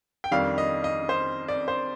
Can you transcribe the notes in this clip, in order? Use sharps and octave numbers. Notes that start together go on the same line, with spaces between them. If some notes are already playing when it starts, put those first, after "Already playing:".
G5
F2 D#3 G3 D4 F5
D#5
D#5
C5
D5
C5